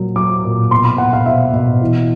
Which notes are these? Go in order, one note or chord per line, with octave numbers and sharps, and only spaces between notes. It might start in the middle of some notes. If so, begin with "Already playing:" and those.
Already playing: A#2 F#3
F#3 D6
A#2
B2 C6
B5
B2 F#5
F5
B2 E5
B2
E3